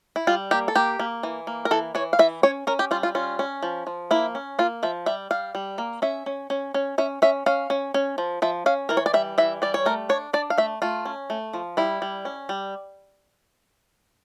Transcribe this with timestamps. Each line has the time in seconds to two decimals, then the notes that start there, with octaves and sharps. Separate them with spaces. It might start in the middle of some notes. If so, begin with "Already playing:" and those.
0.16 E4
0.27 G3 F4
0.51 A#3 G4
0.68 A4
0.76 A#3 G4
1.00 A#3
1.23 E3
1.47 A#3
1.65 A#4
1.71 E3 A4
1.95 E3 C#5
2.13 F5
2.19 E3 E5
2.43 C#4 C#5
2.67 C#4 A#4
2.79 G4
2.91 G3 F4
3.03 F4
3.15 C#4 F4
3.39 C#4
3.63 F3
3.87 F3
4.11 A#3 E4
4.35 C#4
4.59 A#3 F4
4.83 F3 E5
5.06 G3 E5
5.31 G3 F5
5.55 G3
5.78 A#3
6.02 C#4 E5
6.26 C#4
6.50 C#4
6.74 C#4
6.98 C#4 E5
7.22 C#4 E5
7.46 C#4 F5
7.70 C#4
7.94 C#4
8.18 F3
8.42 F3 E5
8.66 C#4 F5
8.89 E3 A#4
8.97 C#5
9.06 D5
9.14 G3 E5
9.38 E3 E5
9.62 G3 D5
9.74 C#5
9.85 A3 A#4
10.09 D4 C#5
10.33 D4 D5
10.50 F5
10.58 A3 E5
10.82 A3 F4
11.06 C#4
11.30 A3
11.54 F3
11.77 G3 E4
12.02 G3
12.25 C#4
12.49 G3